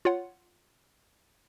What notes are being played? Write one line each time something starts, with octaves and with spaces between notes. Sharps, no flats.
F4 C#5 F#5